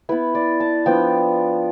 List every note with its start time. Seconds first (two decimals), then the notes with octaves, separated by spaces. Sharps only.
0.09 B3 E4 B4
0.35 D5
0.60 A5
0.86 F3 B3 D4 G5